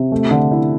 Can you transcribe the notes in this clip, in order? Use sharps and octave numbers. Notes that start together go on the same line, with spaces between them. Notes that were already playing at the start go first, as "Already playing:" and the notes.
Already playing: C3
A3
D3
E4